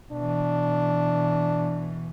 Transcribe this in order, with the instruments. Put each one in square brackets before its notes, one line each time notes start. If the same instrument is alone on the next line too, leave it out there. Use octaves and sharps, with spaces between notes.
[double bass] B2 E3 [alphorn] D4